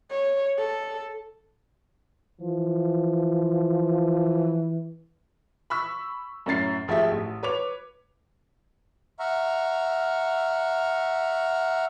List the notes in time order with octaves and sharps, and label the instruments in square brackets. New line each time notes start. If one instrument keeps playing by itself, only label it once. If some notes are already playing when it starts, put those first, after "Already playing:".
[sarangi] C#5
A4
[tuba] E3 [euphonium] F3
[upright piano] B5 C#6 E6 B6
F#2 A2 C#4 A6 C7
G#1 F3 G#3 A3 G4 E5
A1
B4 C#5 D6 F7
[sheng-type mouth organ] E5 F#5 A#5 C#6 F6